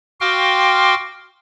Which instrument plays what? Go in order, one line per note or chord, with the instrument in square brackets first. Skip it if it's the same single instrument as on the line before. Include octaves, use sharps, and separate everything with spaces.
[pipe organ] F#4 F5 G5 C6 D6 F6